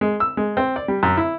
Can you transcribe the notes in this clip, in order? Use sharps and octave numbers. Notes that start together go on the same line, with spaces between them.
G#3
E6
G#3
C4
D5
G3
F#2
E4